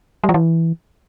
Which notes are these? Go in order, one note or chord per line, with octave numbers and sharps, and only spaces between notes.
G3
F3
E3